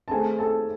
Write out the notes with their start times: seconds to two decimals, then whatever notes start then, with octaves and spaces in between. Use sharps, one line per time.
0.08 A5
0.11 D#3 A3 C4 D#4 G#4 G#5
0.38 A4 A5